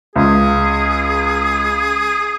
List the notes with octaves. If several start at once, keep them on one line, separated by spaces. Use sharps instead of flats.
C#2 G#4